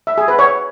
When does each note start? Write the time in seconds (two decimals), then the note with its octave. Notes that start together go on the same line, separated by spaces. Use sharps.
0.07 E5
0.18 G#4
0.28 B4
0.39 C#5